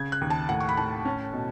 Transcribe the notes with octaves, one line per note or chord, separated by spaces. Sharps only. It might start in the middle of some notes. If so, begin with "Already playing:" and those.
Already playing: C#3 G#6
F#6
D#2
A5
A2 F#5
C#6
B5
A2 A5
C#4
B2